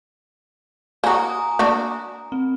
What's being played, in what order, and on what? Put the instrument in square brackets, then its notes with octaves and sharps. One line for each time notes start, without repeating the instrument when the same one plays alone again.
[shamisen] A#3 F#4 [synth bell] G#5 A#5 D#6
[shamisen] A#3 D4 F#4
[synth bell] C4